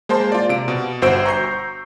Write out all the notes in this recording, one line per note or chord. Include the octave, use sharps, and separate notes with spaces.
G#3 A#3 C5 A5 C6
F4 D5
C3 D7
B2
G1 F#4 C5 E6 D7
A#5 C#6 G6 C7